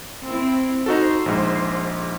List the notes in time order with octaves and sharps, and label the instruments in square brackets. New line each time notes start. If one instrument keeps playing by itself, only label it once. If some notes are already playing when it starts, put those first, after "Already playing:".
[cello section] C4 E4
[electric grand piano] D#4 F#4 A4 [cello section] C5
[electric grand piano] A#1 G#2